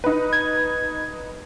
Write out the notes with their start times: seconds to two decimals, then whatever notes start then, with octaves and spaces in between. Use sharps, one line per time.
0.04 D#4 B4
0.33 G#6